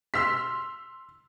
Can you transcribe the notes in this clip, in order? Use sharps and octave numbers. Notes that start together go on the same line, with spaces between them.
C6 E6 F6 B6